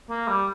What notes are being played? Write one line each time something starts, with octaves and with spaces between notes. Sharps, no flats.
A#3
G3